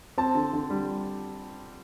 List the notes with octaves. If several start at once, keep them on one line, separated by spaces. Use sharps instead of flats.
C4 A5
D3
D3
G3